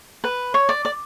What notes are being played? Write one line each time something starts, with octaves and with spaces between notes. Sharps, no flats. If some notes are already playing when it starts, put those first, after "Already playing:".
B4
C#5
D5
D5